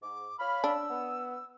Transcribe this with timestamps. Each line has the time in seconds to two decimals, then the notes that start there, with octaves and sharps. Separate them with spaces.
0.03 G#2 D6
0.39 C#5 F5 B5 F6
0.64 D4 E6
0.91 B3